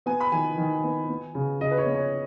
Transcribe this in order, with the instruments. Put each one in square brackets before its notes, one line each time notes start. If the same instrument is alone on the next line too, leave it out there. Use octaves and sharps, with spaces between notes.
[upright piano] B3 G#5
B5
D#3 G#5
D#3
B3
B3
C#3
C#3 D#5
B4
C#5
B3
C#5